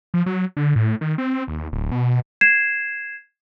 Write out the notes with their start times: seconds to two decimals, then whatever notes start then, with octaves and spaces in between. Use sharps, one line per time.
0.14 F3
0.26 F#3
0.57 D3
0.76 A2
1.01 D#3
1.18 C4
1.48 D#2
1.72 D1
1.92 B2
2.41 G#6 C7 E7